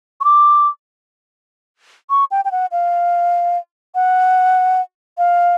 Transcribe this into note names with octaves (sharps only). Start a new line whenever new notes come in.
C#6
D6
C#6
G5
G5
F#5
F5
F#5
F5